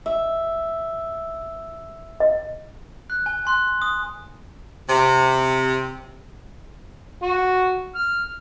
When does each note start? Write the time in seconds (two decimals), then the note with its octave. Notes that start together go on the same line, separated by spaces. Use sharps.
0.06 E5
2.20 D#5
3.10 F#6
3.26 G#5
3.45 G#5 C6 F#6
3.82 D#6
4.89 C3
7.23 F#4
7.95 F6